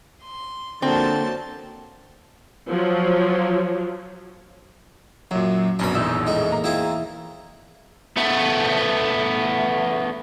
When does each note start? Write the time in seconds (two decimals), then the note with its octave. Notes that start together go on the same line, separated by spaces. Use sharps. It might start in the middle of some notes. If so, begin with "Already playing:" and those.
0.22 C6
0.82 D3 F3 F#3 A#3 C4 A5 A6
2.70 F3 F#3
5.31 F#2 A#2 F#3
5.79 A#1 F#2 B2 D4 B5
5.95 E2 A2 D#4 E6
6.27 A2 G#3
6.51 A#3 A#5
6.64 C4 E4 F4 G#4
8.17 A3 B3